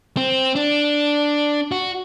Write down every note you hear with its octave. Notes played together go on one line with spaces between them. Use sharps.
C4
D4
F#4